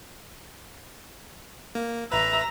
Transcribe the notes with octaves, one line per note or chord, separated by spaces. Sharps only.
A#3
A1 B4 E5 A#5